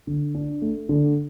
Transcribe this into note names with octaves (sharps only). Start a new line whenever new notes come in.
D3
D4
A3
D3